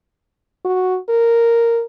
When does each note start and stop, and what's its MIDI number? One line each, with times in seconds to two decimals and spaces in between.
0.65 0.98 66
1.09 1.83 70